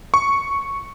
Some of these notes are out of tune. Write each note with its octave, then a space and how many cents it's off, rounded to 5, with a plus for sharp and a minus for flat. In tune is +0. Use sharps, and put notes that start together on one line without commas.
C#6 +0